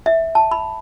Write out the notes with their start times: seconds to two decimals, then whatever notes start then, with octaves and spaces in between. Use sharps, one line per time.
0.06 E5
0.35 A5
0.51 B5